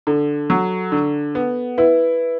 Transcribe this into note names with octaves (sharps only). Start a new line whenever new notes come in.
D3 A4
F#3
D3
B3
E4 B4